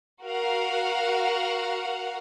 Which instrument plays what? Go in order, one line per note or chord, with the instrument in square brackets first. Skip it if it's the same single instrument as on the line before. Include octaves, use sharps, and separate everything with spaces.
[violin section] F#4 A#4 F5 F#5